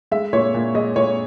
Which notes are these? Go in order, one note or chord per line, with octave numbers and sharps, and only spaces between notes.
G#3 E5
A#2 C#5
A#2
G#3 D#5
A#2 C#5